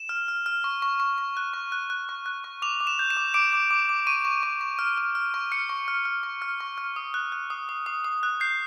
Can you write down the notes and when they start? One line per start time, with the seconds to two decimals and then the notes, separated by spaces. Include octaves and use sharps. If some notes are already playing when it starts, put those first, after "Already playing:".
Already playing: E7
0.09 F6
0.28 F6
0.46 F6
0.64 C#6
0.82 C#6
1.00 C#6
1.18 C#6
1.37 F#6
1.54 C#6
1.72 F#6
1.90 F#6
2.09 C#6
2.26 F#6
2.44 C#6
2.62 D6 F7
2.81 D6
2.87 E7
2.99 G6
3.10 E7
3.17 D6
3.34 D6 D7
3.53 D6
3.71 D6
3.89 D6
4.07 C#6 D#7
4.25 C#6
4.43 C#6
4.61 C#6
4.79 F6
4.98 F6
5.15 F6
5.34 C#6
5.52 F6 C#7
5.69 C#6
5.88 F6
6.05 F6
6.23 C#6
6.42 F6
6.60 C#6
6.78 F6
6.96 D#6
7.14 F#6
7.32 F#6
7.50 D#6
7.69 D#6
7.86 D#6
8.04 D#6
8.23 F#6
8.40 G6 C7